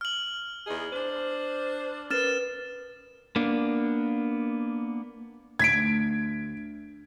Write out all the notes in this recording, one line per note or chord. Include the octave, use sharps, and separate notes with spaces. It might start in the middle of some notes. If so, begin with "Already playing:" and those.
F6 F#7
E2 D#4 G#4
D4 C5
C#4 A#4 B4 F6 A6 E7
A#3 B3 D4
D2 G#6 B6 D7